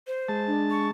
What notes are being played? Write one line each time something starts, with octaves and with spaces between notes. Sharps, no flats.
C5
G#3 A5
D4
C#6